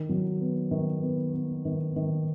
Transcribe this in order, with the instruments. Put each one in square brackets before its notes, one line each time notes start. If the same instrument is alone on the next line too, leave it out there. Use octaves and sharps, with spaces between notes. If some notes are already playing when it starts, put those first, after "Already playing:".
Already playing: [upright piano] D#3
F#3
B3
D#3
B3
B3
D#3
D#3